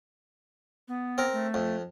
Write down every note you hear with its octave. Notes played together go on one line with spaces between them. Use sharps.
B3
C4 A#4
A3
F2